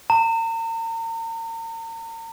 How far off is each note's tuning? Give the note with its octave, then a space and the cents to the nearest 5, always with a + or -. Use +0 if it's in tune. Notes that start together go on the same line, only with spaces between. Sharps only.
A#5 -40